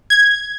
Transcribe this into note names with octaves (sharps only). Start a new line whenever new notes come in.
G#6